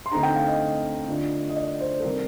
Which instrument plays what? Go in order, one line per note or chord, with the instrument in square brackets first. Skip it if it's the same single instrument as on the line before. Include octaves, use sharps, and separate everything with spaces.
[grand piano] C6
D2 D3 A3 C4 D#4 A#5
G5
F5
D#5
D2 D3 A3 D4 F4
D#5
D5
C5
A4
C3 D#3 G3 A#4